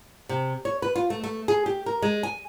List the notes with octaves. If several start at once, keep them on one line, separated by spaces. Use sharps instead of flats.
C3
C#5
B4
F4
A3
A3
G#4
G4
A#4
G#3
G#5